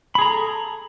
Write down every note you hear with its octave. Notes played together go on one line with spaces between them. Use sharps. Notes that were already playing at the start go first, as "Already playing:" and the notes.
G#4 A4 A#5 B5